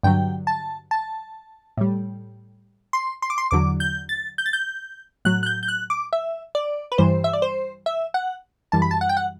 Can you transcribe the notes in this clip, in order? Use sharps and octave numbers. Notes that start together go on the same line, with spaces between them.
G2 D3 F#3 G5
A5
A5
A2 G3
C6
C6
D6
C6
E2 D3 F#3 D6
G6
A6
G6
A6
G6
A2 F#3 F#6
F#6
G6
G6
F#6
D6
E5
D5
B4
G2 E3 G3 C5
E5
D5
C5
E5
F#5
F#2 E3 G3 A5
B5
A5
F#5
G5
F#5